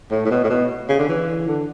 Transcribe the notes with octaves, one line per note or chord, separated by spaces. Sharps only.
A2
A2
B2
A2
B2
C#3
D3
E3
D3